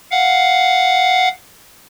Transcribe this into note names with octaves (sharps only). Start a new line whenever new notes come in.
F5 F#5